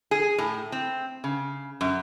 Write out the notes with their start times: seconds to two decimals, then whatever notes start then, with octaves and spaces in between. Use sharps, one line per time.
0.11 G#4
0.38 A2
0.72 C4
1.24 C#3
1.81 F#2